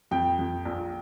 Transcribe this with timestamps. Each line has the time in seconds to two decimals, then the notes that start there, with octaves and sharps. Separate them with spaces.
0.11 F2 G5
0.39 F2
0.65 A#1